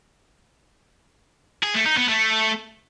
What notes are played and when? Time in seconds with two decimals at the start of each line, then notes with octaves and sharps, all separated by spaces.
1.63 G#4
1.75 A3
1.86 D#4
1.97 B3
2.08 A3